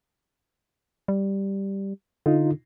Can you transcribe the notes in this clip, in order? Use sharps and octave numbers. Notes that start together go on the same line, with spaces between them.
G3
D3 D#4 F4